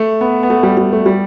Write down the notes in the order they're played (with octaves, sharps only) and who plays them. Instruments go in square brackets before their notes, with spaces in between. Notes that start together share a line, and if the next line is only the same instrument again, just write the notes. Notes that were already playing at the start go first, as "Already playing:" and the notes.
Already playing: [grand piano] A3
B3
B3
A3
G3
G3
A3
G3